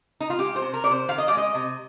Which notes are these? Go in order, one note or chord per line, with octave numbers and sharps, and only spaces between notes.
D#4
F4
G#3 G4
C5
C3
A#4
C3 D5
C5
D#3 F5
D#5
G#3 D5
D#5
C3